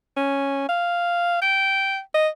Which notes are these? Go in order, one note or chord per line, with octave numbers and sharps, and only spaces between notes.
C#4
F5
G5
D#5